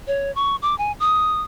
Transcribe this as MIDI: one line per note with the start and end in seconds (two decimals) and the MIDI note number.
0.07 0.33 73
0.35 0.56 85
0.62 0.77 86
0.78 0.92 80
1.00 1.42 87